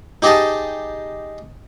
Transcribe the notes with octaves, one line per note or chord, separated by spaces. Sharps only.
D#4 G4 G#4 D#5 A5